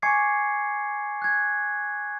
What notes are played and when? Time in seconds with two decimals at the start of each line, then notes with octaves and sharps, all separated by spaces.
0.02 G#5 C#6 D6 G#6 C7 C#7
1.22 F#6 G#6